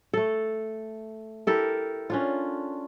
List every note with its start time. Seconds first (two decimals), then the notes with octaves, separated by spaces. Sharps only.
0.14 A3 A4
1.47 E4 G4 A4 A#4
2.10 C#4 D4 F4